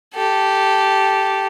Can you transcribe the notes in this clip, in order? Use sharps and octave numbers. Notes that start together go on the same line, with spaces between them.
G4 A4